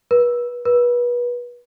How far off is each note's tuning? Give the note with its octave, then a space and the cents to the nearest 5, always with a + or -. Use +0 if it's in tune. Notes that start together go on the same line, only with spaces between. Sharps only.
B4 -35
B4 -30